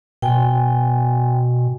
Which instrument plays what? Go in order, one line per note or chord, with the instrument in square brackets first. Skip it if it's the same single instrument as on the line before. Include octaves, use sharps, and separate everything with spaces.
[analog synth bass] B2 [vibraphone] G5 G#5